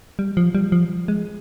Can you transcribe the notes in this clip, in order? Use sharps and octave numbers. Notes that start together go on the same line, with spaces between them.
G3
F3
G3
F3
G#3